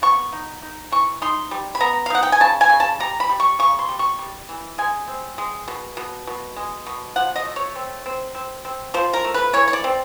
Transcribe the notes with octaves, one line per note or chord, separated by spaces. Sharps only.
B3 C#6
D#4
D#4
E3 C#6
D#4 C6
G3
B5
B3 A#5
F5
D#4 F#5
G5
G#5
C#3 A5
G#5
C#3
A5
G3 A#5
B5
G3
C#6
C#3 C#6
C6
G3
C#6
G3
E3
G#3 G#5
C4
G#3
B2
B2
B2
G#3
B2
F3 F#5
D#5
A3
C#5
C4
C4
C4
C4
F3 C5
A#4
A3
B4
E3 C#5
C#5
D5
C4